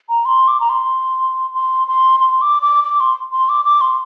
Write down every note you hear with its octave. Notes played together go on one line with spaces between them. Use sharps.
A#5
C6
D6
A#5
C6
C6
C6
C6
D6
D6
D6
C6
C6
D6
D6
C6